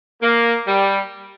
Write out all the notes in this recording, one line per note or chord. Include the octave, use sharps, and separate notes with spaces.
A#3
G3